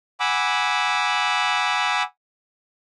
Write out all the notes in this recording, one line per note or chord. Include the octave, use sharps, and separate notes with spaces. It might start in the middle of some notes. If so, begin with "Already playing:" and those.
F#5 G#5 B5 D6 E6